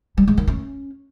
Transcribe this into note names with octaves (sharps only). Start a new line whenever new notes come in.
G3
G#3
D#3
C#4